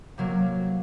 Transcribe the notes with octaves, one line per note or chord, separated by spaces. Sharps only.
C3 F#3 A#3